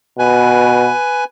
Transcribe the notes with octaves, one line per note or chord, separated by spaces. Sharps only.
B2 B4 G#5